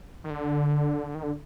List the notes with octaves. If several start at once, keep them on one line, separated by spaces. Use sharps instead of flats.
D#3
D3
D#3
D3